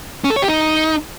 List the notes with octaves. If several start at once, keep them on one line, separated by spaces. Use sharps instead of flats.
C#4
A4
C#5
G4
D#4